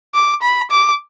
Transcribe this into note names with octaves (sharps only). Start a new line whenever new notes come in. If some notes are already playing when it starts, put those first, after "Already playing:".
D6
B5
D6